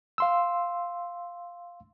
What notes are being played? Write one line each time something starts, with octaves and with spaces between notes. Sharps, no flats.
F5 C6 E6